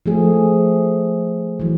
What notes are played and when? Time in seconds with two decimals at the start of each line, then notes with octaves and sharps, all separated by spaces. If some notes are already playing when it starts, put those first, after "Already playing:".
0.06 F3 A3 G#4
1.60 E3 F#3